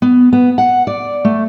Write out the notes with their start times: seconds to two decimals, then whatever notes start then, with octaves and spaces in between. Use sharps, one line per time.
0.02 B3
0.33 B3
0.58 F#5
0.87 D5
1.25 A3